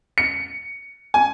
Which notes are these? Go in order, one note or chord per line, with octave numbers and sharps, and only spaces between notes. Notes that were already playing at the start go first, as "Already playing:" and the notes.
C#7
G#5